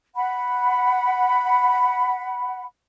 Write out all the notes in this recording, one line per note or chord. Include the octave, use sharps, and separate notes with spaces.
F#5 B5